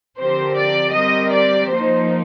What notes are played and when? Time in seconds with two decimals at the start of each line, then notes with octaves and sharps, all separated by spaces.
0.18 D3 F3 C4 G4 A#4 C5
0.56 D5
0.94 G3 C4 G4 A#4 D#5
1.32 D5
1.69 F3 A#3 D#4 C5